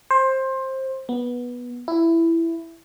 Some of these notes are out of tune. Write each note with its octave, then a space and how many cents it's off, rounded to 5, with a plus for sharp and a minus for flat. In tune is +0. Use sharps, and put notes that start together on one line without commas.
C5 +20
B3 -15
E4 +10